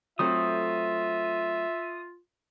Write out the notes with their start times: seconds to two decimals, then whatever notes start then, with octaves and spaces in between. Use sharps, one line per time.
0.19 F#3 A3 C4 F4 E5 D#6